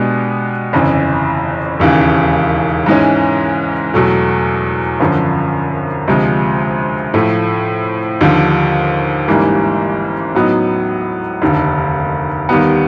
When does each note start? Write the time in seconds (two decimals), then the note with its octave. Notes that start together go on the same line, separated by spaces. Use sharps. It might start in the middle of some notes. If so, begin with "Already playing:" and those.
Already playing: B2 G#3 B3 D4 G4
0.73 G1 F2 C#3 E3
1.79 E1 D#2 C#3 E3
2.86 G#2 E3 G#3 C#4
3.94 E2 B2 F#3 A3
5.00 G#1 F#2 D3 F3
6.08 D2 C3 F3 G#3
7.14 A2 F3 A3
8.21 D#2 D3 F3
9.28 A1 G#2 E3 G3 A#3
10.35 A2 F#3 B3 D#4
11.42 F1 D#2 D3
12.49 D#2 D#3 G3 B3